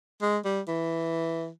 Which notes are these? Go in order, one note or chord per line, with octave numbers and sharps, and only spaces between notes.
G#3
G3
E3